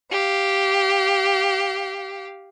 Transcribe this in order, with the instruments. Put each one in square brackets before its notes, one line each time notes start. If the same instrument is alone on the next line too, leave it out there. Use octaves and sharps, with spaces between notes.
[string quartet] G4 F5